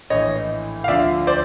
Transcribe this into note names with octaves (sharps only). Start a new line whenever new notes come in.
A#1 A2 E3 C#5 D#5
F5
D2 D3 F3 D5 E5
C5 D5